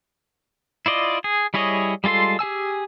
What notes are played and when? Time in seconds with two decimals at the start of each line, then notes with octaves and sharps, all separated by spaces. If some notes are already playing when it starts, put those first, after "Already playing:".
0.86 E4 F4 D5 D#5
1.24 G#4
1.54 G3 E4 G#4 C#5 D#5
2.04 G3 G#3 F4 A4 C6
2.39 G4 G#4 G#5 E6